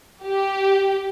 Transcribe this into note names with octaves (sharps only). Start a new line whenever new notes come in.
G4